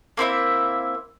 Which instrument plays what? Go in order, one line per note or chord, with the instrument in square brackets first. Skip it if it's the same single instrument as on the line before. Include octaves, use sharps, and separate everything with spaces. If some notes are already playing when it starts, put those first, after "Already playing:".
[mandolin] A#3 C4 E4 E5